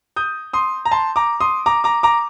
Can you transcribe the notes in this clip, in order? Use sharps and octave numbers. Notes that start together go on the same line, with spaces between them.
D#6 G6
C6 D#6
A#5
A5 C6
A#5 D6
C6 D#6
A#5 D6
A#5 D6
A#5 D6